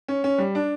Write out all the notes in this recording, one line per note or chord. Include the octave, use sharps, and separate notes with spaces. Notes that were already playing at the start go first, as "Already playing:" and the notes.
C#4
C#4
G3
D4